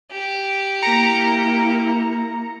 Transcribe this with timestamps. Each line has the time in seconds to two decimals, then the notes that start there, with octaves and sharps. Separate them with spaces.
0.12 G4
0.82 A#3 E4 A#5 C#7